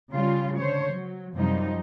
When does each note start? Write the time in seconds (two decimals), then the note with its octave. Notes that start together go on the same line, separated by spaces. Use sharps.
0.13 C#3 G3 F4
0.58 D3 C5 C#5
0.93 F#3
1.35 F#2 C3 F3 G3 D#4